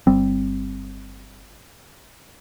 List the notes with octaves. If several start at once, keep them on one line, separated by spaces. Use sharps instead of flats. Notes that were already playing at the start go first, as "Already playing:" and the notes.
G1 G3 C4